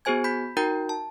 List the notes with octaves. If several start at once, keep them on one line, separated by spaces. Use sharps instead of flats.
B3 F#4 G#4 C5 G#5 G#6
B5 G6 B6
D#4 F#4 A#4 G5 A#5 G6
A5